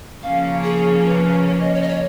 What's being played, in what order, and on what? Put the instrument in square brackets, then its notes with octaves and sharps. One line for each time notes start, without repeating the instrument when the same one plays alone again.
[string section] C#3 F3 A#3 C#4 [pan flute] F5
[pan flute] G#4
B4
C#5
D#5
C#5
D#5
C#5